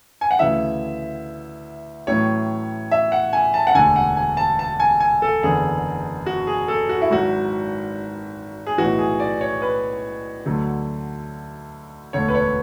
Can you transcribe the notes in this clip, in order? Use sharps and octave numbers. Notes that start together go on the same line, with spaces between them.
G#5
F#5
D2 C#3 E3 E5
A1 A2 F#3 C#5
E5
F#5
G#5
A5
F#5
E1 D2 D3 G#5
F#5
G#5
A5
A5
G#5
G#5
A4
F#1 E2 D3 G#4
F#4
G#4
A4
F#4
E4
G#1 G#2 F#3 F#4
G#4
B1 A2 E3 F#4
G#4
D5
C#5
B4
D2 D3 F#3
E1 D2 D3 C#5
B4
C#5